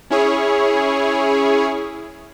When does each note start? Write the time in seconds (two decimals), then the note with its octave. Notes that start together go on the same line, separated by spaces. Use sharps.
0.10 C#4 E4 G#4 C#5